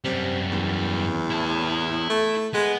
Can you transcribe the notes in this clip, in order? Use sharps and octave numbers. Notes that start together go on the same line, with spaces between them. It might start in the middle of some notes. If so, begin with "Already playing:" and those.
F#2 C3 G3
E2
E4 A5
A3
G#3 B3